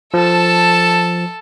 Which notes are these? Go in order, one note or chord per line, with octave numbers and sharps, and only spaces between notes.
F3 A4 A5